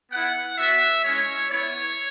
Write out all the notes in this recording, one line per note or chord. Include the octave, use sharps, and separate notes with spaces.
B3 E4 F#5
B3 F#4 E5
G#3 C#4 E4 C#5
B3 E4 C#5